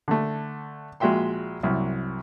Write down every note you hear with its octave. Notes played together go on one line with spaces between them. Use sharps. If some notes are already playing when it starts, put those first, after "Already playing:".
D3 A3
A#1 G#3 F#4 E5 G5 C6
C2 F#2